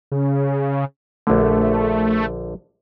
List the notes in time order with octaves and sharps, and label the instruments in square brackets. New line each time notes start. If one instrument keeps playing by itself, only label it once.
[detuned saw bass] C#3
[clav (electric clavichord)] A#1 D3 [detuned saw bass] A3